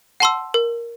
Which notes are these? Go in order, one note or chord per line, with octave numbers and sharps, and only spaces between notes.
F#5 A5 C6 E6
A#4